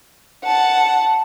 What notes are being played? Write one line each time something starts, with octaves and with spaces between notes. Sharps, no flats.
F#5 A5